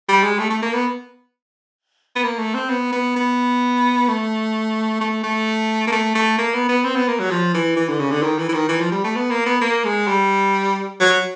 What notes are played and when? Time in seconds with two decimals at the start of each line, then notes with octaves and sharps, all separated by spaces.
0.09 G3
0.23 G#3
0.39 A3
0.50 A3
0.62 A#3
0.73 B3
2.16 B3
2.24 A#3
2.39 A3
2.54 C4
2.70 B3
2.92 B3
3.16 B3
4.08 A3
5.01 A3
5.24 A3
5.87 A#3
5.92 A3
6.16 A3
6.38 A#3
6.54 B3
6.69 B3
6.85 C4
6.96 B3
7.08 A#3
7.20 F#3
7.31 F3
7.54 E3
7.76 E3
7.89 D3
8.00 C#3
8.12 D3
8.23 D#3
8.38 E3
8.49 E3
8.54 D#3
8.69 E3
8.81 F3
8.92 G3
9.04 A3
9.16 B3
9.31 A#3
9.46 B3
9.61 A#3
9.84 G#3
10.08 G3
11.00 F#3